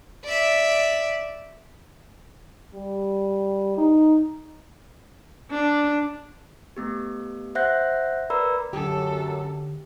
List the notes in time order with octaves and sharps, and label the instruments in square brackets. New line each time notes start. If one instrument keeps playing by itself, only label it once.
[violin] D5 E5
[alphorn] G3
D#4
[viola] D4
[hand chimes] A3 B3 G4
C5 E5 F#5 F#6 G6 A#6
A#4 B4 D5 A#5 B5 E6
[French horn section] F#2 [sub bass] D3 [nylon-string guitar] G4 [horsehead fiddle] A4